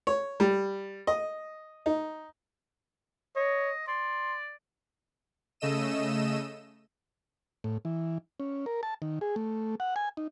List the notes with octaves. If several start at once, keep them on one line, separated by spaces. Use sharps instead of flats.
C#5
G3
D#5
D#4
C#5 D#5
D5 C6
C#3 A3 D#5 E6 D#7 E7
A2
E3
C#4
A#4
A5
D#3
G#4
A3
F#5
G#5
D#4